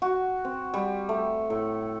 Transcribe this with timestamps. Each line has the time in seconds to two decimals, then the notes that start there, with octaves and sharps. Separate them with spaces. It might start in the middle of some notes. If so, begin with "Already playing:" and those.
0.02 F#4
0.45 C4
0.74 G3
1.09 A3
1.50 A2